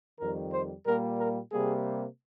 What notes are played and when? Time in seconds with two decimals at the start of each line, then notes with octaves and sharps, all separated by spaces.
0.20 F2 D#3 G3 A#4
0.52 C5
0.86 A#2 G3 A#3 A#4
1.19 A#4
1.52 C3 G3 A#3 G#4